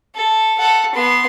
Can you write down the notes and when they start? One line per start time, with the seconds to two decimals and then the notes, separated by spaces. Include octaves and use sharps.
0.15 A4
0.58 A4 F#5
0.94 B3 C6